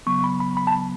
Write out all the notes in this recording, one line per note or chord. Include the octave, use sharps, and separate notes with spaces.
C#3 F#3 B3 C#6
B5
B5
B5
A5
B5